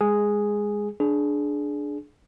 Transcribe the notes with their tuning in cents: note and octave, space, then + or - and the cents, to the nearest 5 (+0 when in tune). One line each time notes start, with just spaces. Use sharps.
G#3 -15 G#4 +0
D4 +0 G#4 +20